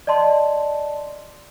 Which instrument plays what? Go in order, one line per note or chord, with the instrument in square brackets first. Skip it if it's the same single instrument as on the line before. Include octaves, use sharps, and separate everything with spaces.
[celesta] D5 D#5 A5 C6